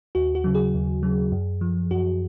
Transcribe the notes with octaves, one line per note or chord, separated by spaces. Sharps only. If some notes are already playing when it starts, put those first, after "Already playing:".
D#2 F#4
F#4
C#3 F#3
G#4
D#2
C#3 F#3
F#2
F3
F#2 F#4